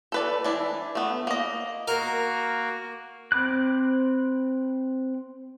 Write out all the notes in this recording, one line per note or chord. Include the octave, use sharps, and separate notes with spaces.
A4 B4 D5
E3 D4 E4
A3 B3
A#3 D#5
A#3 F#4 A#4
C4 B5 D6 F#6